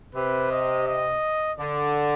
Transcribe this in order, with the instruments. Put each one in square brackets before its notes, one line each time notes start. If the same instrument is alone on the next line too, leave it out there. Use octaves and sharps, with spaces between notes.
[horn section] C3 [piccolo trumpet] B4
[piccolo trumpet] D#5
D#5
[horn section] D3 [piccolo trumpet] D5